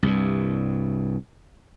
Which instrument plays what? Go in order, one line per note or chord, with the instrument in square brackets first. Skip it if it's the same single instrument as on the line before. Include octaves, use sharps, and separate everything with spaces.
[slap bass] C2 G2